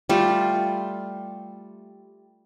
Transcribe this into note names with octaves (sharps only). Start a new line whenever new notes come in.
G3 A3 F4